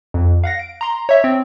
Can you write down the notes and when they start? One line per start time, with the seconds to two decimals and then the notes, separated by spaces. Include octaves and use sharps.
0.14 F2
0.44 F5 F#5 A#6
0.59 D7
0.81 A#5 C6
1.09 C#5 E5
1.24 C4